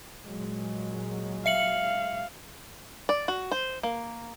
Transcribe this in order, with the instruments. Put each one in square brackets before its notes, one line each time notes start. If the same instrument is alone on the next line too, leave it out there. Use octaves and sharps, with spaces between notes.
[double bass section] A#2 F#3 G#3
[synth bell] E5 C#7 F#7 [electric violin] F5
[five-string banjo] D5
F#4
C5
A#3